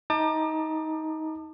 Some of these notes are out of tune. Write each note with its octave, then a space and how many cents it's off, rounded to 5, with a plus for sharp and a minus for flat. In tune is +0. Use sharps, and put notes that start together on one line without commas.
D#4 +20 A5 +30 D6 +40